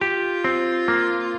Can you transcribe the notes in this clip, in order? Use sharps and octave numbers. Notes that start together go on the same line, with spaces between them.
F4 G4
C4
A#3